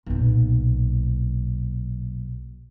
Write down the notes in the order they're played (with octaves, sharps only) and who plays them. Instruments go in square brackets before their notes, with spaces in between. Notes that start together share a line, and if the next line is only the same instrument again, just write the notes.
[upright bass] B1 A#2